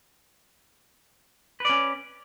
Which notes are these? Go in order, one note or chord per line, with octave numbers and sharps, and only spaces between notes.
C#4 B4 D5